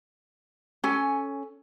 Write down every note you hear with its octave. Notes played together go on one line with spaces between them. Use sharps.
C#4 A4 G#5